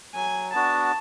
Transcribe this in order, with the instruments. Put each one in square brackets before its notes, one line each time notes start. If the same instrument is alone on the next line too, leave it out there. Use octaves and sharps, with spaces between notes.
[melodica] F#3 [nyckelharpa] G#5
[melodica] B3 D4 F#4 [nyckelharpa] A5